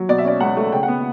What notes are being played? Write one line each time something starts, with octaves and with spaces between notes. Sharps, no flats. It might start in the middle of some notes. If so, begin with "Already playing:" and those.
Already playing: F#3
B2 D5
E5
C#4 D5
C#2 F#5
A3
C#3 G5
F#5
B3